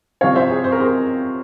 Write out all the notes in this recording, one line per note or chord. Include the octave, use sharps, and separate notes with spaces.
C3 F3 C#5 F5
C5 E5
G#4 C5
C5
A#4
G#4 C5